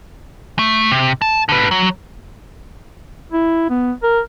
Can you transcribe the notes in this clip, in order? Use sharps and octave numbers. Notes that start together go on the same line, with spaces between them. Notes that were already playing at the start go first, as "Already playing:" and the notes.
A3
C3
A5
D3 B4
F#3
E4
B3
A#4